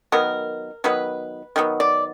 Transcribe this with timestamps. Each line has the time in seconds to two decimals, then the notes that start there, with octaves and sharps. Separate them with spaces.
0.12 D#3 F#3 B3 A#4
0.84 D#3 F#3 B3 B4
1.56 D#3 F#3 B3
1.80 D5